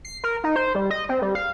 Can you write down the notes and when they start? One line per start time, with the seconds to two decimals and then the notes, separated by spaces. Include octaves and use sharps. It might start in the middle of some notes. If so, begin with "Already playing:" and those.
0.05 C7
0.24 A#4
0.44 D#4
0.56 C5
0.75 G3
0.91 D#5
1.09 C4
1.22 G3
1.35 F5